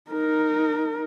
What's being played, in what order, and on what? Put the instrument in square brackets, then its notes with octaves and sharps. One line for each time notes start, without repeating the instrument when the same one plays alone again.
[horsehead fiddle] D#4 A#4